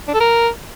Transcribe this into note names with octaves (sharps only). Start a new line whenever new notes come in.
D4
A4
A#4